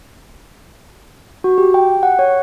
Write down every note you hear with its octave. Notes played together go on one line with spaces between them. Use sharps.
F#4
G4
G5
F#5
C#5